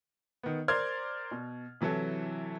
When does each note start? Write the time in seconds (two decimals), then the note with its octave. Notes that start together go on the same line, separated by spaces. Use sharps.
0.43 D#3 B3
0.68 A#4 C5 D5 C6 F6 G#6
1.31 B2
1.81 C3 E3 F#3 E4 A4